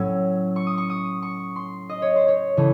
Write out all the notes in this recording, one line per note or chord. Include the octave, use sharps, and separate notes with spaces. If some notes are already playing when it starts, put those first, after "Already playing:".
Already playing: A2 F#3 C#4 E6
C#6
D#6
C#6
D#6
C#6
C6
D#5
C#5
C5
C#5
C#3 E3 A3